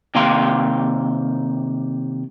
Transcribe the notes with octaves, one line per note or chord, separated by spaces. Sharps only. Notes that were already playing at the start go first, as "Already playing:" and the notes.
C3 D#3 A#3 F5 G5 C6